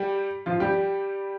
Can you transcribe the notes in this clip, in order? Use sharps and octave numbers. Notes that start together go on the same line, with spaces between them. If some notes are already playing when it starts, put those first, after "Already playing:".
Already playing: G3 G4
F3 F4
G3 G4